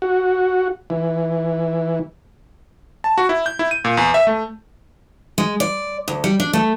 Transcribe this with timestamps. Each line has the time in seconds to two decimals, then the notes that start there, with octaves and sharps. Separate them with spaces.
0.02 F#4
0.90 E3
3.04 A5
3.18 F#4
3.29 E4
3.46 G6
3.59 E4
3.71 D#7
3.85 A#2
3.97 E2
4.14 E5
4.27 A3
5.38 G#3
5.60 D5
6.08 D2
6.24 G3
6.40 D4
6.53 A3